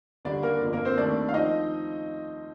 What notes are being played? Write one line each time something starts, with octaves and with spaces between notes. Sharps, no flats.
D#2 D3 G3 D4 D5
A#3 A#4
G1 F2 D3
A#3 A#4
C4 C5
D#2 D#3 A3 C4 D4 D5
F5
F3 C4 D#4 D#5